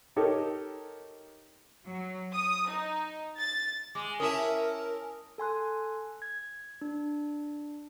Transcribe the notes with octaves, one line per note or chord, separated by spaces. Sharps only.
D#4 G4 A4 A#4 C#5
F#3
D#6
D#4
A6
G#3 D6
C#4 E4 A#4 E5 A5 D#6
A4 G#5 C6 F#6
G#6
D4